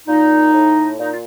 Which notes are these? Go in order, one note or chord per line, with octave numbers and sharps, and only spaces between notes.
A#2 D#4
A2
A#2 D#4
F4